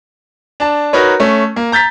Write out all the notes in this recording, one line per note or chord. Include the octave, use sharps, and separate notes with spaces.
D4 A5
D#4 F#4 A#4 B4 C#5
A3 C#4
A#3
A#5 G6 A6 B6